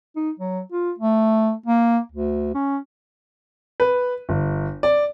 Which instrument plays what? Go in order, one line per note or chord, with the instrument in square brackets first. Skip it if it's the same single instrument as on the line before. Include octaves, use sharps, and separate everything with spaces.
[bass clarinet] D#4
F#3
F4
A3
A#3
D2
C#4
[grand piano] B4
G1
D5